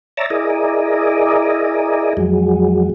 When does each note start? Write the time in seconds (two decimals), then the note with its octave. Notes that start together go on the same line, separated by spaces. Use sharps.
0.17 C#5 D5 E5 A5 A#5
0.30 E4 G#4 A#4 D5 D#5
2.17 F2 F#3 G#3